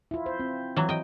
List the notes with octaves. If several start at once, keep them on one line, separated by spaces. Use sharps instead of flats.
E4 F4
C5
C4
E3 F#3
D#5 G5